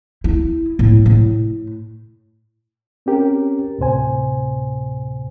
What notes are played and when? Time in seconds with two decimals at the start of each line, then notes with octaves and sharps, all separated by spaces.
0.24 E4
0.79 A2
1.06 A2
3.06 C4 C#4 G4 A#4
3.79 D2 A2 C3 C5 G#5